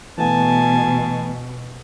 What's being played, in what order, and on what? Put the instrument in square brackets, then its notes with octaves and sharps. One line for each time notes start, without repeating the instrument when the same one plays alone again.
[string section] B2 [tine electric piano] E3 A3 B3 [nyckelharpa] G#5 A5